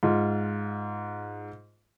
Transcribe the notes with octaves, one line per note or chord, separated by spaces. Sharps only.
G#2 F4